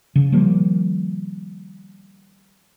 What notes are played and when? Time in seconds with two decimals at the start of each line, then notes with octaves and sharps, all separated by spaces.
0.16 C#3
0.32 D#3 F3 G3 A#3